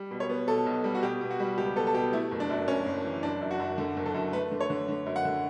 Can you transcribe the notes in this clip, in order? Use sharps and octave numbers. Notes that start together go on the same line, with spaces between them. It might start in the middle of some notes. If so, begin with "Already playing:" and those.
Already playing: G3
B2
C#5
B3
B2 A4
B1
G3
F#4
B2 G4
B2
F#4
G3
C#2 G4
B3 A4
A4
B2 G4
A3 E4
F#1
D4
F#2
F#1 C#4
F#1
E3
F#1 D4
F#2
F#4
F#2
D3
F#1
A4
F#2
A3 B4
D3
C#5
D3
D3
F#2
F#5
D3